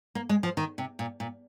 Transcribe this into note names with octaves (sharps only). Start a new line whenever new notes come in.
A#3
G#3
F3
D#3
C3
A#2
A#2